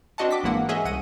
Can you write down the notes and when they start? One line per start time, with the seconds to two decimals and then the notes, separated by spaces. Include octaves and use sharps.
0.18 C4 D4 F#4 D#5 F#5 A5
0.31 D6 B6
0.43 G#1 E3 G#3 A#3 F#5
0.69 C#4 G#4 D#5 E5 F#5
0.85 C2 F#5 D#7